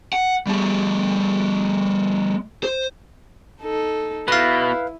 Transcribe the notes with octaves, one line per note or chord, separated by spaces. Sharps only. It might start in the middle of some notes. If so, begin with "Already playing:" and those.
F#5
G3 A3
C5
D#4 A4
B2 E4 B4 F5